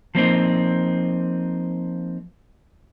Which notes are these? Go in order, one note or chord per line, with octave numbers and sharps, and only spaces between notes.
F3 A#3 C4 D#4